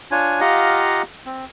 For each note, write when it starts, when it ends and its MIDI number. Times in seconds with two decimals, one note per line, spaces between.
0.11 0.40 62
0.11 0.40 65
0.11 0.40 73
0.11 0.40 80
0.41 1.02 65
0.41 1.02 67
0.41 1.02 75
0.41 1.02 77
0.41 1.02 78
0.41 1.02 82
1.26 1.45 60